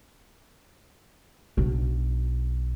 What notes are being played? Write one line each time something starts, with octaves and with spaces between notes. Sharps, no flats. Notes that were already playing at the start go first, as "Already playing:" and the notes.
B1 D4